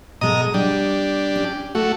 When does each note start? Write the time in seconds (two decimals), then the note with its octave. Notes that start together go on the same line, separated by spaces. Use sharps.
0.21 B2 G#3 A4 D#5 A#5 D#6
0.54 G3 D4 G4
1.36 C#4
1.75 A3 F#4 A4